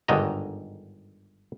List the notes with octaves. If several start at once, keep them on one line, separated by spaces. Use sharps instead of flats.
G1 G#2 D3 D#3 D#5 A#5